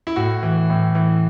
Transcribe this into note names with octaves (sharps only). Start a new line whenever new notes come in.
E4
A2 F#4
E3
A2
E3